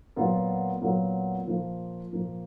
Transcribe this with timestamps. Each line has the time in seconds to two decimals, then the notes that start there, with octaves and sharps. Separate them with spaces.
0.16 A#2 F#3 B3 F4 A#4
0.81 A#2 F#3 B3 F4 A#4
1.47 A#2 F3 A#3 F4
2.12 A#2 F3 A#3 F4